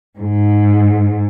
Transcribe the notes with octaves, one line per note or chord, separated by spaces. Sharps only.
G#2